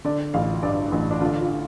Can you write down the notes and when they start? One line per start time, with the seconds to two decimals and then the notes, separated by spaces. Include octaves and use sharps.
0.05 D3 D5
0.34 A1 F5
0.63 G2 D5
0.92 A1
1.11 D4
1.21 D3 F4
1.40 F4